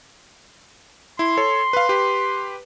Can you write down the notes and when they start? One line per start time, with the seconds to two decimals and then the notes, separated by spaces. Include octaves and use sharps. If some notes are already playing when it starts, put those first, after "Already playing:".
1.19 E4 C6
1.37 A4 C#5
1.73 B4 F5
1.89 G4 B4